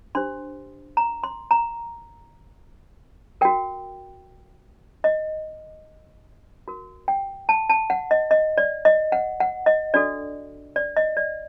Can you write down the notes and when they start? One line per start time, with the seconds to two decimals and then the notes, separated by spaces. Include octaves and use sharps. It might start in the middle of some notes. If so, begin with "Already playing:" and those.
0.15 D4 G4 C5 C6
0.97 A#5
1.24 C6
1.51 A#5
3.41 F#4 A#4 G5
5.04 D#5
6.68 F#4 A#4
7.08 G5
7.49 A5
7.70 A5
7.90 F#5
8.11 D#5
8.31 D#5
8.58 D5
8.85 D#5
9.12 F#5
9.40 F#5
9.66 D#5
9.94 D4 F#4 A4 D5
10.76 D5
10.97 D#5
11.17 D5